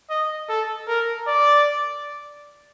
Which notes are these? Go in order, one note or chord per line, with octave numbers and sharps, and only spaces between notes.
D#5
A4
A#4
D5